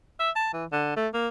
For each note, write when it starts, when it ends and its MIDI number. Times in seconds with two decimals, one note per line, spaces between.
0.20 0.30 76
0.36 0.49 81
0.53 0.65 52
0.72 0.94 50
0.96 1.08 57
1.14 1.28 58